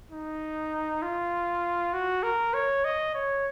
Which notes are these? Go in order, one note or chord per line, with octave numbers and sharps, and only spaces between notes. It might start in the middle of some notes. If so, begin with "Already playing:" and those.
D#4
F4
F#4
A#4
C#5
D#5
C#5